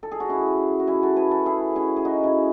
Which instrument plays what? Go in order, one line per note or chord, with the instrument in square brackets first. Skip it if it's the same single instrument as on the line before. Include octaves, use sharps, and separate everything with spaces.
[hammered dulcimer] A4
G#4
F#4
C#4 E4
F#4
E4 G#4
F#4 A4
G#4 B4
F#4 A4
E4 G#4
C#4 E4
G#4
D#4 F#4
C#4 E4